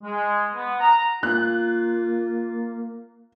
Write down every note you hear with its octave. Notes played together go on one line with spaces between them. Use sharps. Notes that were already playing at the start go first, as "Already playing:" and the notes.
G#3
B3
A#5
A#3 F4 F#6